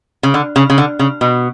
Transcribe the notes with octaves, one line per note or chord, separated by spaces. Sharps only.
C#3
D3
C#3
C#3
D3
C#3
B2